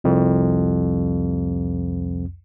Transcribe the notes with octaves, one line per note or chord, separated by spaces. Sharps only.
C2 F2